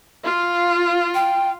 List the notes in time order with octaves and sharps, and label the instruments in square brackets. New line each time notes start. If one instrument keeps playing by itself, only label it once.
[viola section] F4
[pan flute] G5